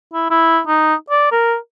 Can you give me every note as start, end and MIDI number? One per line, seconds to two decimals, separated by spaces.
0.14 0.27 64
0.30 0.60 64
0.67 0.95 63
1.10 1.29 74
1.32 1.55 70